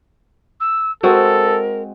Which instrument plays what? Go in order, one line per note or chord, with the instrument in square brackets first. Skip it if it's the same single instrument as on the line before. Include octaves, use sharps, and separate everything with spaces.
[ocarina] E6
[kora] G#3 C4 F#4 [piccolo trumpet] A4 [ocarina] A#4